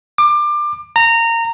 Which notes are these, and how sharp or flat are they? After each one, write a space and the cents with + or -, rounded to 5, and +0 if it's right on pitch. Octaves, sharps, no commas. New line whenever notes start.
D6 +25
A#5 -20